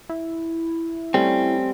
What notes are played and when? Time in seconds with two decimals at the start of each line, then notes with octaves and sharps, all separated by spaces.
0.10 E4
1.14 G3 A3 C4 C#4